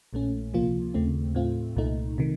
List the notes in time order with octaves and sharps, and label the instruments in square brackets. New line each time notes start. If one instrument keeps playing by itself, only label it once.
[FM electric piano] A#1 A#2 A3 C#4
C#2 C3 F3 A#3 F4
D#2 C#3 A3 C4
A2 A3 C4 F4
C2 A#2 A3 D#4
C3 D#3